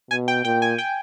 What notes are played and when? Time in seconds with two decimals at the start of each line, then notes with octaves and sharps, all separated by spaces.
0.11 B2 G#5
0.28 G5
0.45 A#2 G5
0.62 G#5
0.78 G5